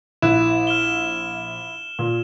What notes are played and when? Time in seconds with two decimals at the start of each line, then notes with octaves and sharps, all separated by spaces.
0.22 A#1 E4 F#6 E7
0.67 F6 E7 G7
1.99 A#2